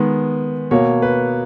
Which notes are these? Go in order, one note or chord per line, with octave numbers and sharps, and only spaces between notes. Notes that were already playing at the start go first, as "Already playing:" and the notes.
Already playing: D#3 G#3 B3
B2 A#3 C#5
B4